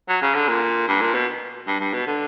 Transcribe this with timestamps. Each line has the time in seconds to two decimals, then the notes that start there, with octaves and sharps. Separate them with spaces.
0.08 F#3
0.22 C#3
0.34 D3
0.48 A#2
0.88 G2
1.01 A#2
1.14 B2
1.67 G2
1.80 G2
1.93 B2
2.07 D3